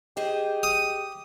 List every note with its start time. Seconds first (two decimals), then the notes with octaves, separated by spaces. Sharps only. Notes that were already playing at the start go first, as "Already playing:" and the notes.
0.17 G4 G#4 C5 D#5
0.63 D#6